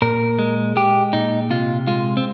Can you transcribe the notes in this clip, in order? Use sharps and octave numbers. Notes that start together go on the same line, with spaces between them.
A#2 A#4
G#3
G#3 G4
A#2 D#4
C3 F4
G#3 F4
C4